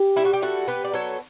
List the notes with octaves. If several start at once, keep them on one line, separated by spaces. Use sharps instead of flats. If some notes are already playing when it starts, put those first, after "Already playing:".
Already playing: G4
G3 E4
F#4
G4
E4 F#4 A4
B3 G4 B4
D5
F#3 A4 C#5